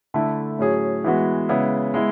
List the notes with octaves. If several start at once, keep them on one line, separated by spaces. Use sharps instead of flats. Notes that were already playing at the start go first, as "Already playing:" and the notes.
D3 A3 E4
A2 F#3 C#4 G#4
E3 G#3 B3 F#4
C#3 G#3 B3 E4 G#4
G#3 B3 E4